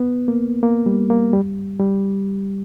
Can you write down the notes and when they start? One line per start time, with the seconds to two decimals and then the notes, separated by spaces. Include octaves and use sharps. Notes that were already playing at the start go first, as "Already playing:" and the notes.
Already playing: B3
0.28 A#3
0.63 A#3
0.86 G3
1.10 A#3
1.33 G3
1.80 G3